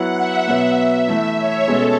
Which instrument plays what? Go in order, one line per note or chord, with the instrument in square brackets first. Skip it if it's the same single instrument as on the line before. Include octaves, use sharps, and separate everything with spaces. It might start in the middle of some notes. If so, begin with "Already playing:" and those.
Already playing: [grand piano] F#3 B3 E4 [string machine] F#5
[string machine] E5
[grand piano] B2 F#3 B3
[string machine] E5
[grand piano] E3 A3 E4 [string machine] E5
[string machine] C#5
[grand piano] B2 G#3 C#4 [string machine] A4